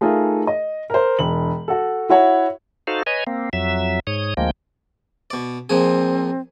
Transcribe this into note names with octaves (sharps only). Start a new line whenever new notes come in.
A3 D#4 F4 G#4 A#4
D#5
A#4 C5
E1 F#7
F#4 A4
E4 F#4 C#5 F#5
D#4 F#4 A4 C5 F5
B4 C#5 D#5 G#5
A#3 C4
F2 F#3 E5
G#2 C#5 D#6
D2 F3 G#3 A#3 G5
B2 D5
A#2 F3 C4 G#4